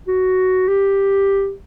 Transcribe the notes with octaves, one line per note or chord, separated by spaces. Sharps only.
F#4
G4